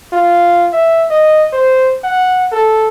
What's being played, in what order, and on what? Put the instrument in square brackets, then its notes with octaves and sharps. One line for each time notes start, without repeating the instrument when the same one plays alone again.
[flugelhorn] F4
E5
D#5
C5
F#5
A4